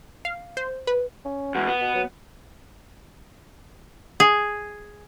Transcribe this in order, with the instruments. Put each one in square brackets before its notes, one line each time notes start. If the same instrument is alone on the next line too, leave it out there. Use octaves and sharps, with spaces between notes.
[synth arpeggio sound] F5
C5
B4
[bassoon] C#4
[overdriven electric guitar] E2 G#3 [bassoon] F#4
[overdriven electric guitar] B3
[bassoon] B2
F#3
[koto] G#4